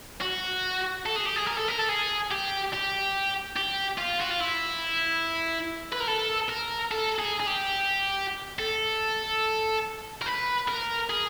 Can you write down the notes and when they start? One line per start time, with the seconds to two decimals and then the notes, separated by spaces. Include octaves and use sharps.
0.21 F#4
1.06 A4
1.16 G#4
1.25 G4
1.36 G#4
1.47 A#4
1.58 A4
1.68 A#4
1.79 A4
1.89 G#4
2.31 G4
2.73 G4
3.56 G4
3.98 F4
4.20 F#4
4.30 F4
4.40 E4
5.92 B4
6.00 A#4
6.08 A4
6.49 A#4
6.92 A4
7.19 G#4
7.40 G#4
7.47 G4
8.59 A4
10.22 A#4
10.26 B4
10.68 A#4
11.10 G#4